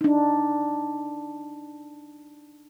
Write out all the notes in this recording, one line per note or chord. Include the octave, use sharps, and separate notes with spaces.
D4 D#4